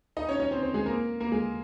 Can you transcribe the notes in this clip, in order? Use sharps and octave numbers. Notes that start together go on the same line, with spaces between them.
D#4 D#5
C#4 C#5
C#4 C#5
C4 C5
C4 C5
G#3 G#4
A#3 A#4
A#3 A#4
G#3 G#4